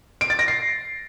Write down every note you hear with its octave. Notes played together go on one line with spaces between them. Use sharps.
D7
A6
A#6
C7